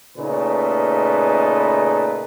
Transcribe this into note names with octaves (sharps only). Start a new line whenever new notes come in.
A#2 C#3 A3 D#4 B4